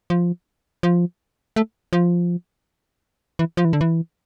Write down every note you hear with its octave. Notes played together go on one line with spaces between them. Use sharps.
F3
F3
A3
F3
E3
F3
E3
D3
E3